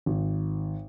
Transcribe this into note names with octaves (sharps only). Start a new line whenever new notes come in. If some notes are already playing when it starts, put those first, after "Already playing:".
G#1